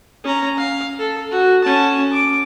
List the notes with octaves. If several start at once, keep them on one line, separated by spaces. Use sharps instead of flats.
C#4 A#5
F5
A4
F#4
C#4 A5
D6